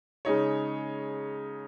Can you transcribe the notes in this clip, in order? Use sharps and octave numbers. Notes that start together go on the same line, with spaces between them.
C#3 G#3 D#4 C#5